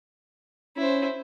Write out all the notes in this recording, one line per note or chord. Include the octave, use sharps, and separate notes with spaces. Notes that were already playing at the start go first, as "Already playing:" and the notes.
C#4 E4 C5